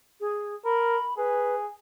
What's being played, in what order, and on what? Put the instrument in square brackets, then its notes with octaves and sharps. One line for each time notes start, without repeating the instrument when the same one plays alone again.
[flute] G#4
[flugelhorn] A#4 [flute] B5
[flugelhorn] G#4 [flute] B4